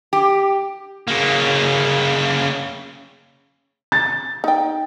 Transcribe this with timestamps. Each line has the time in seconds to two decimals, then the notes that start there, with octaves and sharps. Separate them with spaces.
0.13 G4
1.08 C#3 A#3
3.92 A6
4.44 D#4 G5